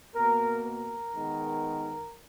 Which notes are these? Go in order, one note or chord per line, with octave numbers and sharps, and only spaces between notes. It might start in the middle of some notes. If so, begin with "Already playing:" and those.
B2 A#3 A#4
A#4
D#3 G#3 B3